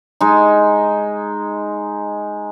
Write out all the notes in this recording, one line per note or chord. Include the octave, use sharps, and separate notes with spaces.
G#3 D#4